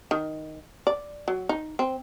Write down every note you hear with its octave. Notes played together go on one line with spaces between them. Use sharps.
D#3
D5
F#3
D#4
C4